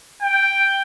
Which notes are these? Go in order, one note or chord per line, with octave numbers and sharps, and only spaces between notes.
G5